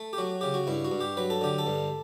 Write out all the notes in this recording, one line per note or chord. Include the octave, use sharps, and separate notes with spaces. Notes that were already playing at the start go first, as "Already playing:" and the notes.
Already playing: A3
G4
F#3 F#4
C#3 G4
F#4
G2 E4
F#4
G2
G4
F#3 B4
A4
D3 G4
A4
G2